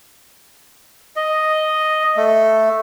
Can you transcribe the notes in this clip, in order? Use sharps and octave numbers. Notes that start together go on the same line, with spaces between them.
D#5
A3